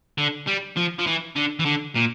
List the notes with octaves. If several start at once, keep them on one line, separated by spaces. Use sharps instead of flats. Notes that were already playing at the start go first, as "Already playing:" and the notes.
D3
G3
F3
F3
E3
D3
E3
D3
A#2